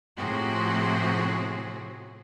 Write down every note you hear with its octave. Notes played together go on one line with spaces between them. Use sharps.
A2 C3 F3 C4 F#4 G#4